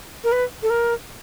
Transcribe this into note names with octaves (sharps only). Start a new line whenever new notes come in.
A#4
B4
A4
A#4